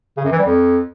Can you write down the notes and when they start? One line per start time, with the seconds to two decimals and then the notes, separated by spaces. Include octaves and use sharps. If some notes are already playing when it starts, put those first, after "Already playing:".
0.17 C#3
0.24 F#2
0.32 E3
0.39 G3
0.46 F2